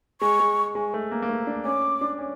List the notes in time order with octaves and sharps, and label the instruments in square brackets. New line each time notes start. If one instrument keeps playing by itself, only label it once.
[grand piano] G#3 [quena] C#6
[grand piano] G#3
G#3
A3
A#3
A#3
A3
D4
[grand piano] C#4 [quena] D6
[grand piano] D4
C#4